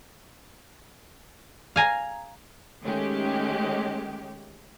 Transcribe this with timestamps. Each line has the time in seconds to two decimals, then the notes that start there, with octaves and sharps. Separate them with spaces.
1.76 F5 G#5 A#5
2.83 D#3 G#3 A3 C#4 G4